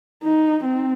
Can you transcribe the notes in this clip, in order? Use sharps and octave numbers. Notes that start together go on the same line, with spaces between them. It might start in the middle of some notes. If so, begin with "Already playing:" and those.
D#4
C4